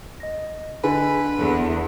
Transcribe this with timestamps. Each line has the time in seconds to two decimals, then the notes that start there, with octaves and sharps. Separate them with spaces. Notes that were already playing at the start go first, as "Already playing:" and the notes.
0.20 D#5 A#6
0.84 D3 B4 G#5
1.38 E2 A4